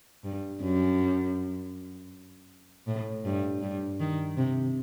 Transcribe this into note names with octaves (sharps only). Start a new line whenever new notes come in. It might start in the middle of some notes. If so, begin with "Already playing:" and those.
G2
F#2
A2
G2
G2
D#3
C3